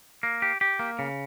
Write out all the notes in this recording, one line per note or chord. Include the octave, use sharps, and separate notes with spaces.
A#3
G4
G4
A#3
C#3